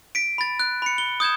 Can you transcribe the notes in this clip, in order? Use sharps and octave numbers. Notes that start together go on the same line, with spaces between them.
B6 D7
B5 A6
F#6
B5 C#7
G7
D#6 G6 G#6 E7